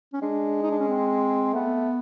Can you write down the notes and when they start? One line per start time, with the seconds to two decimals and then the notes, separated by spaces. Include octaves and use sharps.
0.13 C#4
0.21 G#3 D4
0.63 D#4
0.71 D4
0.79 C#4
0.88 C4
1.54 A3 B3